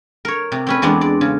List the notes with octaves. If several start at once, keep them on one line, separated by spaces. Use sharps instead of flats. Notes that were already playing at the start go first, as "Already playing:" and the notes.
A#4 C#5
C3
C4 C#4 B4
E2 G#3 B3 C4 D4
D5
C#3